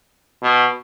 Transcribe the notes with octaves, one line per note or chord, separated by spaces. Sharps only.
B2